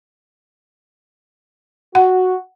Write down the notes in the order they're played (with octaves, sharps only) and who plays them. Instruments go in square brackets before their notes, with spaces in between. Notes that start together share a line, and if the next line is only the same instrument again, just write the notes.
[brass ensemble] F#4 [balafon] F#5